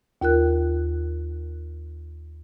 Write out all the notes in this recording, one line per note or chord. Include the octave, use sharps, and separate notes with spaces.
D#2 F4 A#4 F#6